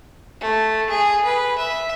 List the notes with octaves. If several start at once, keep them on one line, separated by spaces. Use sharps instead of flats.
A3
G#4
B4
E5